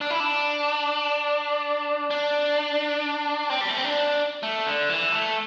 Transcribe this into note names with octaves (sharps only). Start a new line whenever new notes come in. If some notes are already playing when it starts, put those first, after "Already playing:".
D4
E4
D4
D4
C4
G3
A3
C4
D4
A3
D3
E3
A3